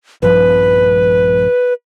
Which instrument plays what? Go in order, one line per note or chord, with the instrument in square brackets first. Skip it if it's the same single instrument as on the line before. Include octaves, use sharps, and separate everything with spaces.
[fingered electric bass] A#1 G2 F3 [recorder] B4